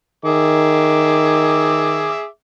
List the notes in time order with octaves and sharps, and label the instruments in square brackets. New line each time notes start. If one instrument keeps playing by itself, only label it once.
[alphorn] D#3 [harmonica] G#4 E5 D6